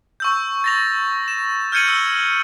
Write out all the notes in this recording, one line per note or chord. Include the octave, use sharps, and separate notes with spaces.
C#6 E6 G6
A6 A#6 F7
E7
F6 G6 G#6 C#7 D#7 F#7
E6